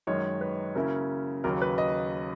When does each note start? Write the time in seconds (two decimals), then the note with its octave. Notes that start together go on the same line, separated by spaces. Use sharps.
0.07 F#2 D#3 G#3 C#5
0.41 B4
0.75 C#3 F#3 A#3 C#4 E4 A#4
1.44 D#2 C#3 F#3 A#4
1.62 B4
1.78 D#5